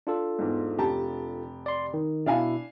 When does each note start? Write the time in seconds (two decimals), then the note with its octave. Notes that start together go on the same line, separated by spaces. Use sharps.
0.07 D4 F4 A4
0.39 E2 G#2
0.78 F1 G4 A5
1.66 D5 C6
1.94 D#3
2.26 B2 D4 E4 F5 G#5